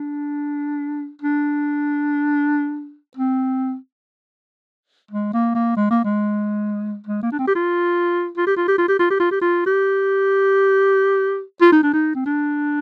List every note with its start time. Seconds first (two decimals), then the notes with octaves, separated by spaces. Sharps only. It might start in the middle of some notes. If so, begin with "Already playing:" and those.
Already playing: D4
1.22 D4
3.17 C4
5.11 G#3
5.34 A#3
5.55 A#3
5.77 G#3
5.91 A#3
6.05 G#3
7.07 G#3
7.23 A#3
7.32 D4
7.39 C4
7.47 G4
7.55 F4
8.37 F4
8.47 G4
8.57 F4
8.68 G4
8.78 F4
8.89 G4
8.99 F4
9.11 G4
9.20 F4
9.31 G4
9.42 F4
9.66 G4
11.61 F4
11.72 D#4
11.83 D4
11.93 D#4
12.15 C4
12.26 D4